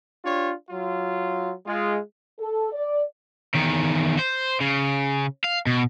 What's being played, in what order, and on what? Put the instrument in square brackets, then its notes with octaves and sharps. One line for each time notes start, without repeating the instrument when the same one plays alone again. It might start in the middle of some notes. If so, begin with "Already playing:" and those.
[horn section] D4 F4 G4 C#5
F#3 F4
G#3 F4
[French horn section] A4
D5
[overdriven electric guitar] E2 D#3
C5
C#3
F5
B2